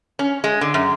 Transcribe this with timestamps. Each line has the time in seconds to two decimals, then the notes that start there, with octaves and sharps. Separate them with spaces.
0.19 C#4
0.44 G#3
0.61 D3
0.74 F#2